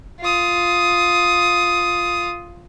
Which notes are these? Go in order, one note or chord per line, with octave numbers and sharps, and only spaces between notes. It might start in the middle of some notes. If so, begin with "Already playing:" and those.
F4 D#6